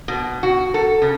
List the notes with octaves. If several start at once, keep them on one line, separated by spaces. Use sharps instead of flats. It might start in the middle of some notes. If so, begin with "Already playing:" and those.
B2
F#4
A4
C#3